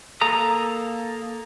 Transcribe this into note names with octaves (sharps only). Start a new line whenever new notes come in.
A#3 A4 A#5 D#6